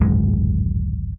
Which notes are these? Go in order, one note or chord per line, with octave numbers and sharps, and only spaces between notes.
D1 G#1 F#2 G#3